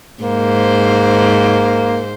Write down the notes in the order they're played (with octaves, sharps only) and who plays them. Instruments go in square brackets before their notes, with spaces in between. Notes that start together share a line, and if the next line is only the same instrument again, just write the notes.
[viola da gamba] G#2 C5 [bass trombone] A#3